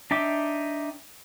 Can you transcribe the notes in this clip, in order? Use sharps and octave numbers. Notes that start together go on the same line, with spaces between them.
D4 D#4 E5 G5 D6